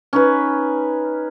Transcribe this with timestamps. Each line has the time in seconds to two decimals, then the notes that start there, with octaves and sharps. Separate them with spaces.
0.13 C#4 D#4 B4